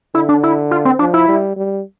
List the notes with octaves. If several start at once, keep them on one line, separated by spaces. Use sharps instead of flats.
D3 E4
D4
E4
F4
C4
F3 D4
E4
G3
G3